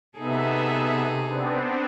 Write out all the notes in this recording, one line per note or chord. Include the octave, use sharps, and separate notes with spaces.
C3 B3 D#4 G#4 A4 E5
B3 C4 D4